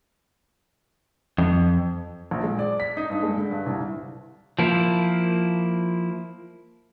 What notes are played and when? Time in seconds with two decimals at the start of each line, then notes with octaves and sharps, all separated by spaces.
1.38 F2
2.31 A#1
2.43 G#3
2.59 D5
2.80 B6
2.97 D#4
3.10 G2
3.23 G#3
3.38 D3
3.51 G2
3.66 C2
4.59 F3 A#3 E4